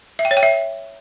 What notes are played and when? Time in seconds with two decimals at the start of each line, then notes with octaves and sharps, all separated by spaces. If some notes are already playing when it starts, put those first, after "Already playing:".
0.19 E5
0.25 G5
0.31 C#5
0.37 G5
0.43 E5